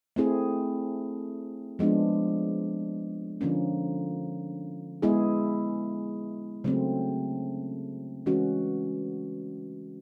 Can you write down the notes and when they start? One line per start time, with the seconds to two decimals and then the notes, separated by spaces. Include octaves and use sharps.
0.16 A3 C4 E4 G#4
1.79 F3 G#3 B3 D4
3.41 D3 F3 A#3 C#4
5.02 G#3 B3 E4 G#4
6.64 C#3 F#3 A3 C4
8.26 E3 G#3 C#4 F#4